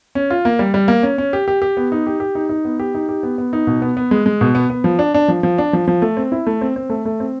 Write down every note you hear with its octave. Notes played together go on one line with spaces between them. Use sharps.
C#4
F4
A#3
G3
G3
A#3
C#4
C#4
G4
G4
G4
B3
D#4
G4
G4
D#4
D#4
B3
G4
D#4
G4
B3
B3
D#4
B2
B3
B3
G#3
G#3
B2
B3
B3
F3
D4
D4
F3
F3
D4
F3
F3
A3
C4
E4
A3
C4
C4
A3
A3
C4